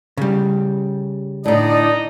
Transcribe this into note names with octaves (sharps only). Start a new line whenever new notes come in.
C#3 G3
A2 D3 D#4 D5 D#5